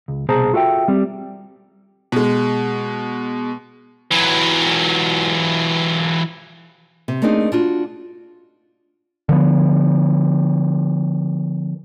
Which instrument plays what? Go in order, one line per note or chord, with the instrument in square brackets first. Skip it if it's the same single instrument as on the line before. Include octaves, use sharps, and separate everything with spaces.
[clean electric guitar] C#2
C2 B2 G#4 C5 A5 A#5
F4 F#4 A4 E5 G5
G3 C4
[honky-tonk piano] B2 G#3
[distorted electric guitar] E3 F#3
[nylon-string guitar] C3
A3 A#3 C4 D4 D#4 G#4
D4 F4 F#4
[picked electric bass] D3 F3 B3